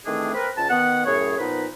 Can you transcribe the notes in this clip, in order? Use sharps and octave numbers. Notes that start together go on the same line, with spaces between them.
D#3 E3 A3 C4 D4 G#4
C4 A#4 B4
C#2 A5
D#3 B3 F#5
F#2 A2 C#4 G#4 C#5
A#2 F3 B3 D#4 B4